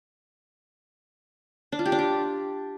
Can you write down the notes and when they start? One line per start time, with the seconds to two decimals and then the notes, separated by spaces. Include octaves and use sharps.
1.72 D4
1.79 F4
1.85 G4
1.92 D4
1.99 G4